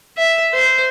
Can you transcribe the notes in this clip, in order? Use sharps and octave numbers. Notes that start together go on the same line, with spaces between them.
E5
C5